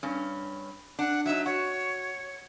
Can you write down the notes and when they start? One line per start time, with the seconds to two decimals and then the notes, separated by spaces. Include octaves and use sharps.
0.03 G2 C#4
0.99 D4 F#5
1.26 F#3 D#4 E5
1.46 F#4 C#5